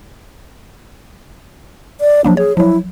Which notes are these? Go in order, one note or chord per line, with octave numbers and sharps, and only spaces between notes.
D5
F3 F#3 A#3 D4
G#4 C#5
F3 F#3 E4